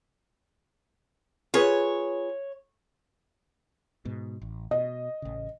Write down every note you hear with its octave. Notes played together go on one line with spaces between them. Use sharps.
F4 G#4 B4 C#5
G#2 B2
A1
B2 D#5
A1 C#3